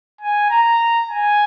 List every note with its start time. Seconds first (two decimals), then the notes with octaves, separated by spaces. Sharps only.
0.21 G#5
0.50 A#5
1.10 G#5